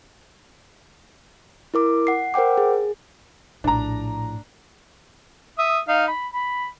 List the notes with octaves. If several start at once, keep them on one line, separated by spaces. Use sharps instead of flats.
E4 A#4 D6
F#5 C7
A#4 C5 F#5 G5 D6
G#4
A#1 A2 D4 A#5
E5 D#6
D#4 F5
B5
B5